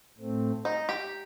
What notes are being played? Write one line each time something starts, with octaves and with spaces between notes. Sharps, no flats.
A2 A3 C4
D#4
G4